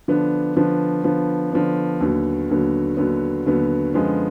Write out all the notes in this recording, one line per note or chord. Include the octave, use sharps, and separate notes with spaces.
D3 F3 B3 D4
D3 F3 B3 D4
D3 F3 B3 D4
D3 F3 B3 D4
D#2 D3 F#3 B3
D#2 D3 F#3 B3
D#2 D3 F#3 B3
D#2 D3 F#3 B3
F#2 D3 F3 G#3 B3